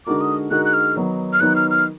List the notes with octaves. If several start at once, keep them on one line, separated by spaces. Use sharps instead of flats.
D3 G#3 D#4 F#4 A#4 D6
D#6
D3 G#3 D#4 F#4 A#4 F#6
F#6
F6
D#3 F#3 B3 D#4
F6
D#3 F#3 B3 D#4 F#6
F6
F6